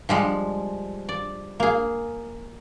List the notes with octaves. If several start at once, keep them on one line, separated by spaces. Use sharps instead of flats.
F3 G3 G#3
D5
A#3 G#4